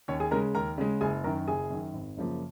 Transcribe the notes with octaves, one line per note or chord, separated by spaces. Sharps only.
D#2 C#4 C#5
G#4 G#5
C#3 G#3 A#4 A#5
D#2 A#4 A#5
C#3 G#3
F#1 G#4 G#5
F#2 D#3 A#4 A#5
F#1 G#4 G#5
F#2 D#3
G#1
F#2 C#3 F3 A#3